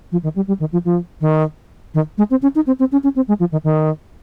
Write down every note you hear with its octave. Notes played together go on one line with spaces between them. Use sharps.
F3
D#3
G3
G3
D#3
F3
F3
D#3
D#3
G#3
C4
C#4
D#4
C4
C4
C#4
C#4
C4
G#3
F3
D#3
D#3